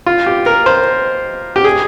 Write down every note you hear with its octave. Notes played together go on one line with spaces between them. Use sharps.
F4
G4
A#4
C5
G4
G#4